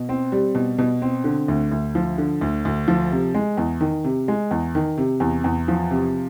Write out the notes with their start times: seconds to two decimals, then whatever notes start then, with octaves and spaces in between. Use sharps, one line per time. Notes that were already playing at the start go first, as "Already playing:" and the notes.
Already playing: B2
0.09 C4
0.32 G3
0.55 B2
0.78 B2
1.02 C4
1.24 D3
1.48 D2
1.72 D2
1.95 F3
2.18 D3
2.41 D2
2.65 D2
2.88 F3
3.12 C3
3.34 G#3
3.57 E2
3.81 D#3
4.04 C3
4.28 G#3
4.51 E2
4.75 D#3
4.98 C3
5.20 E2
5.44 E2
5.68 F3
5.91 C3